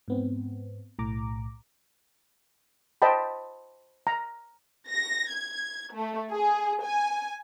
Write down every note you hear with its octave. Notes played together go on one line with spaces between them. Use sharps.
G#2 B3 C4
B1 A2 A#5 D6
C5 D#5 G5 A5 B5
A#5
A#6
G#6
A3
G#4
G#5